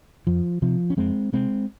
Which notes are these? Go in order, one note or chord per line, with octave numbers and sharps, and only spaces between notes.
F2 F3
C3 F3
C#4
F2 G#3 C4
C3 G#3 C4